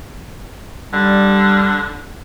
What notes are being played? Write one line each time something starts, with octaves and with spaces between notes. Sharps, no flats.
D3 G3